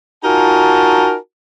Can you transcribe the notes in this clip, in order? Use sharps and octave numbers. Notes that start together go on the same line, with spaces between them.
D#4 F4 F#4 A#4 G#5 A5